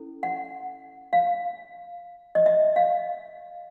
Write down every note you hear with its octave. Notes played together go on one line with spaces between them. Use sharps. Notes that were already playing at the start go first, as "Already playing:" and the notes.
Already playing: C#4 E4 A4
F#5
F5
D#5
E5
F5